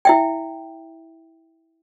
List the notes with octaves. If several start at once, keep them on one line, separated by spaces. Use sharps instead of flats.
E4 E5 G5